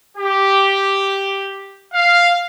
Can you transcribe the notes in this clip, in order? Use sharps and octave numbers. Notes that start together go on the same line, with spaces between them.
G4
F5